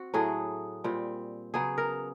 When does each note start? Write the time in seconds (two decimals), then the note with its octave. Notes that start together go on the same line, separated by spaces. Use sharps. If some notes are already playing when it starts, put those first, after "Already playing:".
Already playing: C4 F#4
0.14 A2 F#3 A3 G#4
0.84 A#2 G3 C4
1.54 C#3 F#3 B3 G#4
1.78 A#4